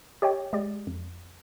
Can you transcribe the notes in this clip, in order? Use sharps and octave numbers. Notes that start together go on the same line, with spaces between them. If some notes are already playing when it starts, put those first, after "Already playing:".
G4 C#5 D#5 G5
G#3 G4 D5
F2